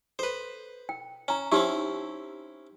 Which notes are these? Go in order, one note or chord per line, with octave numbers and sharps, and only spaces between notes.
A4 B4 C5
G5
C#4 G#5 A#5
C4 C#4 D#4 E4 G4 C#6